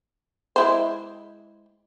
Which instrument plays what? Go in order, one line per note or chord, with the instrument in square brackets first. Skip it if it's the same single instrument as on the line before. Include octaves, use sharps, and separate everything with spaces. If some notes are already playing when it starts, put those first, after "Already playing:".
[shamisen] G#3 E4 C5